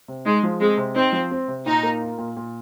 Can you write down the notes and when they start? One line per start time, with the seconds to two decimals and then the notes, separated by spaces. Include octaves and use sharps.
0.08 C3
0.25 G#3 D#4
0.43 F3
0.61 G#3 C4
0.78 C3
0.95 C4 D#4
1.13 F3
1.31 C4
1.48 C3
1.65 A#2 D#4
1.83 A#3
2.01 F4
2.18 A#2
2.37 A#2